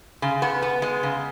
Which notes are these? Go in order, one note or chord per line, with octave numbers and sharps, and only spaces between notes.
C#3
B3
B3
G#3
C#3